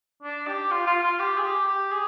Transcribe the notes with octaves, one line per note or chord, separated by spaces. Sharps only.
D4
G4
F4
F4
F4
G4
G#4
G4
G4
G#4